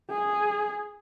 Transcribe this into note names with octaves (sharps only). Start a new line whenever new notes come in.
G#4